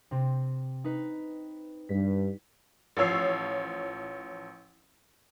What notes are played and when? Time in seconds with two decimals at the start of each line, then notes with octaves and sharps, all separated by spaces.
0.11 C3 C4
0.84 D#4 B4
1.89 G2 B6
2.97 A1 F3 C#5 E6 C7